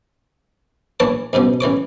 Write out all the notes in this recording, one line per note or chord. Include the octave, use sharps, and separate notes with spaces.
A#1 E3 C#5 A5 D6
C#2 G2 B2 F3
A1 E3 C#5 D6